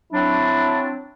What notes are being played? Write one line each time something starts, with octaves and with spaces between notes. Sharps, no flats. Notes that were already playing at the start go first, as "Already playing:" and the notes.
F#3 C4 D4 E4